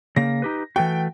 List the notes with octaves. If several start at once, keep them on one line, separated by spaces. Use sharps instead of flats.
C#3 A#3 A#6
D#4 G4 B4
E3 A3 F#4 G5